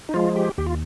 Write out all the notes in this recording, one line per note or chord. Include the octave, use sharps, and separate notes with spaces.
D#4
F3 G#3 F4
G4
D#2 G4
F4